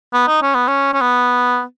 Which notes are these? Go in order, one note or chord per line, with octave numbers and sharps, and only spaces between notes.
B3
D#4
C#4
B3
C#4
C#4
B3